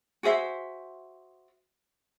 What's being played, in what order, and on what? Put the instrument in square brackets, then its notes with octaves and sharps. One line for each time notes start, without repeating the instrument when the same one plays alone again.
[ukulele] F#4 G#4 C5 E5